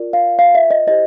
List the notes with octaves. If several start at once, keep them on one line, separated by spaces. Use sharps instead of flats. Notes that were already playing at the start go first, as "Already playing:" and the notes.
Already playing: F4 A#4 D5
F5
F5
E5
D#5
E4 G4 C5 D#5